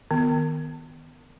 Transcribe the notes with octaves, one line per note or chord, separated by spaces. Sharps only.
D#3 B3